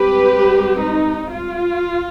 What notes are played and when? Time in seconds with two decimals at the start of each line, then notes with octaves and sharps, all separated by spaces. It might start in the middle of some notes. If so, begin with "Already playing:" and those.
Already playing: G#2 G3 C4 G4 B4
0.82 D#4
1.32 F4